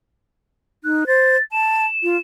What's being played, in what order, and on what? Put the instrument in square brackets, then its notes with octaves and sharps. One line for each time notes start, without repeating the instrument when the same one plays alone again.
[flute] D#4 [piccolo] F#6
[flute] C5 [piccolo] A6
[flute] A5 [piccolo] E7
[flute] F4